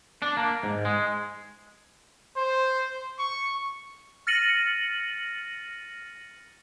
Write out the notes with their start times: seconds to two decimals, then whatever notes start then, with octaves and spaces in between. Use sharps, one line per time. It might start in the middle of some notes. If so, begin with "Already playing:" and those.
0.22 D4
0.37 A#3
0.63 G#2
0.85 G#3
2.37 C5
3.19 C#6
4.27 F6 A6 A#6 C#7 D#7 F#7